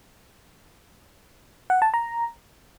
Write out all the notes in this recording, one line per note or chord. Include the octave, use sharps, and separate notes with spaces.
F#5
A5
A#5